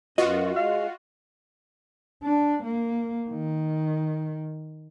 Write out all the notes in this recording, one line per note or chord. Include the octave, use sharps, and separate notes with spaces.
F#2 B3 F4 F#4 D#5
G#3 F5
D4
A#3
D#3